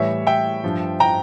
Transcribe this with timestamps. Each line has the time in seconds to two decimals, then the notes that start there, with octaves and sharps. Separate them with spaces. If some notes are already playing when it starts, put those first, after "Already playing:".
Already playing: A2 E3 G3 C#5 E5
0.27 E5 G5
0.64 G2 F3
1.00 G5 A#5